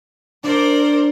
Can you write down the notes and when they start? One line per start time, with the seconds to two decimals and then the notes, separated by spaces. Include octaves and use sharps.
0.44 D4 A#4 C5 D5